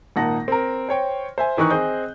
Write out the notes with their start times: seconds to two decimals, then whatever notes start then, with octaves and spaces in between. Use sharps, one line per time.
0.16 G#1 A#2 D#4 F#5 A5 A#6
0.48 C4 A#4
0.89 C5 C#5 G5
1.38 C5 E5 G#5
1.57 D#3 E3 D#4 C#6 F#6
1.70 C4 G#4 D#5 G6